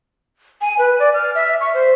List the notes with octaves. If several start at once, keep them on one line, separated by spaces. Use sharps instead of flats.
G#5
B4
D5
F6
E5
C#6
C5